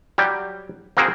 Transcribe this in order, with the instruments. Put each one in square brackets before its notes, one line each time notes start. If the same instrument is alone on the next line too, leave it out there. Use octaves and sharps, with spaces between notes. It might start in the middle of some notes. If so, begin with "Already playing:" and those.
[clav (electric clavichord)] F#3 G3 G4
A#3 C4 F#4 G#4 A#4 C5